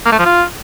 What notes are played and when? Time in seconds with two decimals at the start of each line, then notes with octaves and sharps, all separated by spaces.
0.05 A#3
0.12 A3
0.19 F3
0.25 F4